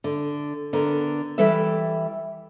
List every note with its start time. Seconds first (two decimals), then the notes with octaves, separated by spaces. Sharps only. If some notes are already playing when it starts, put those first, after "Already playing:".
0.04 D3
0.73 D3 B3 A#4
1.38 E3 G3 A4 B4 E5